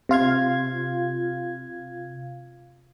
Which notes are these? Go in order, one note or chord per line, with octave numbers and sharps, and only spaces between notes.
C3 F4 F5 G#6